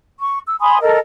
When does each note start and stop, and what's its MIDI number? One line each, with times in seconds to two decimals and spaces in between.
0.20 0.39 85
0.47 0.56 88
0.60 0.78 80
0.60 0.78 83
0.60 0.78 84
0.60 0.78 87
0.81 0.99 69
0.81 0.99 70
0.81 0.99 75